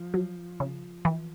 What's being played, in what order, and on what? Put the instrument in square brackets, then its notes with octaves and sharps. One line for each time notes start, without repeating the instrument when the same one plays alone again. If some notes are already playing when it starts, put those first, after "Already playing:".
Already playing: [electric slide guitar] F3
[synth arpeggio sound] F#3
C#3
E3